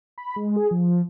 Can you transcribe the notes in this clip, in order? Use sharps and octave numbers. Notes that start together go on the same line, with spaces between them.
B5
G#3
G#4
F3